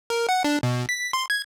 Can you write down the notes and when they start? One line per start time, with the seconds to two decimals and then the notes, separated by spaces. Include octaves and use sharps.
0.10 A#4
0.29 F#5
0.44 D4
0.63 B2
0.89 B6
1.13 C6
1.30 G#6